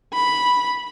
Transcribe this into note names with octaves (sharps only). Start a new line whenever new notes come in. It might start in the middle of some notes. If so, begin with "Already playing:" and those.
B5